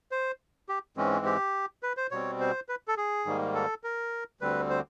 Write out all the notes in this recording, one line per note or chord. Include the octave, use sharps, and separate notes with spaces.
C5
G4
G#2 E3 G#3 C4 C#4
G4
B4
C5
B2 G3 C4 C#5
C5
B4
A4
G#4
G#2 D#3 G3 A#3
A4
A#4
D2 D3 G3 C4 B4
C5